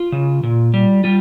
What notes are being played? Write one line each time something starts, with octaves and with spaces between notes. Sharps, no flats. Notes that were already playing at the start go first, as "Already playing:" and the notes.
Already playing: F4
C#3
A#2
G3
G3 F4